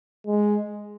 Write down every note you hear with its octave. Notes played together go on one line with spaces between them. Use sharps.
G#3